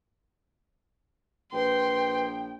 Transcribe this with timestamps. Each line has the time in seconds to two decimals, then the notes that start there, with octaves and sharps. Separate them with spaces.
1.52 A#1 B4 G5 C6